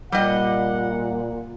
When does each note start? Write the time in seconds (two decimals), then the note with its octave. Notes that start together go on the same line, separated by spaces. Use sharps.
0.12 A#2 G3 D#5 F#5